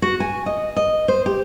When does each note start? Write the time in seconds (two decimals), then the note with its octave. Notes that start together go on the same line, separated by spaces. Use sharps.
0.02 F#4
0.20 G#5
0.46 D#5
0.76 D#5
1.08 C5
1.26 G4